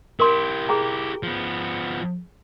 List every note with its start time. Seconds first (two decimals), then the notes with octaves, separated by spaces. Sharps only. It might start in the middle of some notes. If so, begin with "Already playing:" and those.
0.20 E4 G4 A#4 C6
0.69 G#4 G5 A#5
1.23 F3 B3